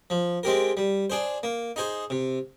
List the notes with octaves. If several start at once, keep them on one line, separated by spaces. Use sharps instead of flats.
F3
G#3 C4 G4 A#4
G3
D4 G#4 C5
A#3
D#4 G#4 C5
C3